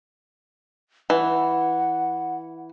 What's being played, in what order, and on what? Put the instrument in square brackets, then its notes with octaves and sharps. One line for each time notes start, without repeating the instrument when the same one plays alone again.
[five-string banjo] E3 [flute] F#5